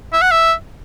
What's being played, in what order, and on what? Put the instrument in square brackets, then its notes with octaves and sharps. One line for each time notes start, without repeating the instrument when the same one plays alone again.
[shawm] E5
F#5
E5